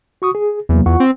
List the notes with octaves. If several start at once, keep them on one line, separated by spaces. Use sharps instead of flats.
F#4 C#6 D#6
G#4
E2 C3 F#3 A#3
E2 F4 F#5 C#6
C4